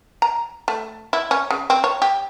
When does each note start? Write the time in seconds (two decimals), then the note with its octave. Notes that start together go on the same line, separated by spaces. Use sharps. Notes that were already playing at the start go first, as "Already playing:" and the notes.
0.22 A#5
0.68 A3
1.13 E4
1.31 C#4
1.51 C#3
1.70 C4
1.84 C#5
2.02 G4